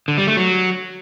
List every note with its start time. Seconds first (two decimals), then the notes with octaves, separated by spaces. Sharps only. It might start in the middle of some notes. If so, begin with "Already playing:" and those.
0.08 D3
0.18 G3
0.27 A3
0.37 F#3